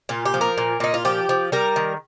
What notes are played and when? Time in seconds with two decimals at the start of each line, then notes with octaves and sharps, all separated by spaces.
0.09 A#2 F4
0.26 G4
0.34 F3
0.41 A#4
0.58 A#2
0.80 A#2 D#4
0.94 F4
1.05 F3 G4
1.29 F3
1.52 G3 A#4
1.76 D#3